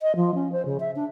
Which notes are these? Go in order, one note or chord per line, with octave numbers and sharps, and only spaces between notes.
D#5
F3
C#4
C5
C#3
E5
D4